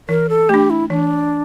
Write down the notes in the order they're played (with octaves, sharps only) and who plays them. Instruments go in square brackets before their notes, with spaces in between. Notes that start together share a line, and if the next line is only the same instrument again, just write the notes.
[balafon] E3 [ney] A#4
[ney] A4
[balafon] A3 D4 [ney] G4
[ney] E4
[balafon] E3 [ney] D4